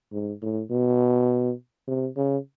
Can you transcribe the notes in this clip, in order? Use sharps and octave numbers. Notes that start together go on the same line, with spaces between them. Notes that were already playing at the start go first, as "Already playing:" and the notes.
G#2
A2
B2
C3
C#3